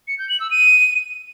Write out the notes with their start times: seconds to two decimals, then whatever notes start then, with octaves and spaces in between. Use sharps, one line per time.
0.08 C#7
0.19 G6
0.29 F#7
0.40 E6
0.51 D#7